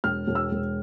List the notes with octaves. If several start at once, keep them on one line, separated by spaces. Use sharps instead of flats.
E1 F6
E1
E6
E1